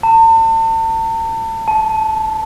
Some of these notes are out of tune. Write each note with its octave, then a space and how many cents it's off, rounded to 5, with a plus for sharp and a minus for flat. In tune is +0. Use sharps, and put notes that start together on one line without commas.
A5 +40
A5 -10